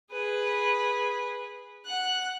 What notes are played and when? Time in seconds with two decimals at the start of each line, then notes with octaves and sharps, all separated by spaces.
0.12 G#4 B4
1.85 F#5 F#6